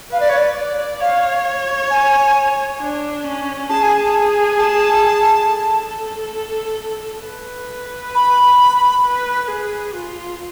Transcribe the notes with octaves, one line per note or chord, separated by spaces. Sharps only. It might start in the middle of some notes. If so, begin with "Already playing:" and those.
B4 F5
D5
C#5
D5
D5
C#5 F5
G#5
D4
C#4
G#4 A5
G#5
A5
A5
A4
B4
B5
B4
G#4
F4